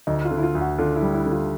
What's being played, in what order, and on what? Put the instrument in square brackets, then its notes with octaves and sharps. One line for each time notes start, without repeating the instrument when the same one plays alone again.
[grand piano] D2 [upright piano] D#4
[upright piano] F4
[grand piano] D3
[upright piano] E4
F4
[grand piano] D2
[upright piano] F#4
[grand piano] D3 [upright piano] F4
[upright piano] E4
[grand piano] G3
[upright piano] E4
[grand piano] D3
[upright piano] F4